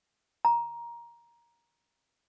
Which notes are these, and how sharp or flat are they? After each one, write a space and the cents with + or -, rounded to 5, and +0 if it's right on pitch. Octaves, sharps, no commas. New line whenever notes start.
A#5 +15